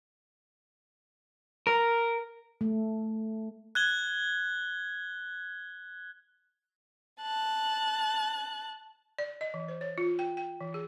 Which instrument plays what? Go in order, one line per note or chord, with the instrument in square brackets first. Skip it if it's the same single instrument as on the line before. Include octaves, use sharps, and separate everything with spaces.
[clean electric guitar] A#4
[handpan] A3
[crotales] F#6 G#6 G7
[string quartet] A5 F#6
[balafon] D5
D#5
E3
C5
C#5
F4
G5
G5
E3
G#4